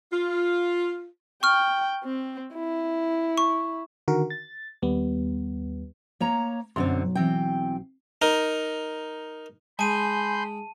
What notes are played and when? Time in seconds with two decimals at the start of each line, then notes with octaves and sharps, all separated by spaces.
0.12 F4
1.43 G5 C#6 F6
2.04 C4
2.55 E4
3.38 C#6
4.08 D3 D#3 F#4 A#4
4.30 A6
4.82 D#2 G3 B3
6.20 A#3 C#5 A#5
6.76 B1 F#2 D3 F#3 C4 C6
7.15 E3 C4 G5
8.22 D#4 A#4
9.79 G#3 G#5 A5 B5 C6 G6 D#7